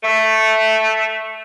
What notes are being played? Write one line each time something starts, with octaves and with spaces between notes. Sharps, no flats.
A3